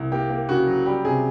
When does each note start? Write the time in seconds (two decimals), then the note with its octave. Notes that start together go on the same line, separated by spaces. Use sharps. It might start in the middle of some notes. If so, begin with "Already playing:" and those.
Already playing: C2
0.12 A#3 G4
0.30 A#3
0.49 C#3 F#4
0.67 F#3
0.86 G3 G4
1.05 C3 G#4